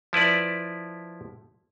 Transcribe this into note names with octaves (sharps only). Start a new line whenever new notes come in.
F3 E4 B4 D5